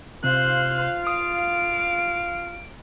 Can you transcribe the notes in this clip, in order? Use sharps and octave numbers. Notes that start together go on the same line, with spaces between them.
C3 F4 C5 F5 F#6
D#6 D7